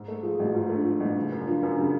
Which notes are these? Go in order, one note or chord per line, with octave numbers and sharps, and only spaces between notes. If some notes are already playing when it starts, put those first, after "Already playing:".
Already playing: G#2
A3
F3 G#4
A1 F#4
G#2 F4
F4
A3
D4
F3
A1
C#3
F#2
F3 D4
F#2 C#4
C#3 D4